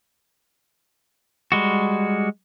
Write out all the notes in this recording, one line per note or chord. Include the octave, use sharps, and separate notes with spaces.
G3 G#3 F#4